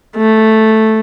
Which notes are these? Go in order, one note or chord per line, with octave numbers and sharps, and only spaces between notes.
A3